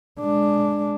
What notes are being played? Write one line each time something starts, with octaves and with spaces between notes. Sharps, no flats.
G#3 D4